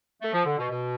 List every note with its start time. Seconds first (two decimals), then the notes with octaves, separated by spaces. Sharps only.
0.22 A3
0.33 F3
0.46 D3
0.58 B2
0.70 B2